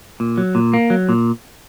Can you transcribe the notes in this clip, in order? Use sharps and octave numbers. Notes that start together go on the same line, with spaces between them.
A#2
F#3
A#2
A#3
F#3
A#2